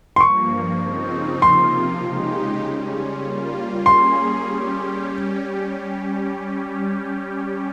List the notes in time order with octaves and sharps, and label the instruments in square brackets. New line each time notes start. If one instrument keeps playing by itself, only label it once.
[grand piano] C6
[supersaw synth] G2 F3 A#3 [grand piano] C#6
[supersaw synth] C#3 F3 C4 D#4
[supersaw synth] C3 F3 A#3 F4 [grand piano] C6
[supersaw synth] C#3 G#3 D#4 G4
C#3 G3 C#4
G3 A#3 F4
[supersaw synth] G3 A#3 C#4 G#4 [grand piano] C6
[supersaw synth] G3 C#4 G4